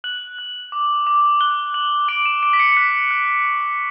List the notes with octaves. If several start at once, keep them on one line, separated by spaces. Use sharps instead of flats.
F#6 F#7
F#6
D6
D6
F#6 G7
F#6 F#7
D6 D7
E7
D6 D7
B6
C#7
C#7
F#6 B6
F#6
C#6